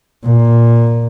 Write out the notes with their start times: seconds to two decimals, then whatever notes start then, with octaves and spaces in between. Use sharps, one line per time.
0.25 A#2